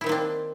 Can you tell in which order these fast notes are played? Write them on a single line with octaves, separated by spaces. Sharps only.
E4 D#3 C4 A#3 D4